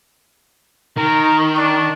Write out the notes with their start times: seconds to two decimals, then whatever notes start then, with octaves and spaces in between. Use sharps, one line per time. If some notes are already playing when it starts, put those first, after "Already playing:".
0.97 D#3 A#4
1.57 D4